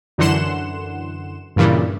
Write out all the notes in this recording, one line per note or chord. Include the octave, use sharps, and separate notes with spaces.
F#2 D3 E3 F#5 C6 E7
G2 A#2 C#3 E3 G3